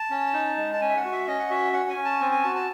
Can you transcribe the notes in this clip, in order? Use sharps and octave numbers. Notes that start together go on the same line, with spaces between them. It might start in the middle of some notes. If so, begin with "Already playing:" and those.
Already playing: A5
C#4
D#4
G#3
A5
C#4 G#5
E5
F#5
F#4
E5
C#4 D#5
F#5
F#4 E5
C#4 F#5
G#5
C#4
A5
C4 G#5
G#5
F#4 A5
A5